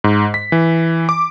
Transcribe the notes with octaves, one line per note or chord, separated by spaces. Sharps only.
G#2
B6
E3
D6